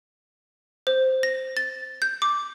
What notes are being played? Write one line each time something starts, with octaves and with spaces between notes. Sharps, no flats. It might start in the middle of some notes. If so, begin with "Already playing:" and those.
C5
A#6
A6
G6
D6